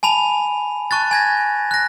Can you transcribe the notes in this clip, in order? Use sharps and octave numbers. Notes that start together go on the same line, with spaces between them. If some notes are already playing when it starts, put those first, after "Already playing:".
G#5 A5 B5 F7
A5 C#6 F#6 A6
G#5 G#6 A#6
F#6 A#6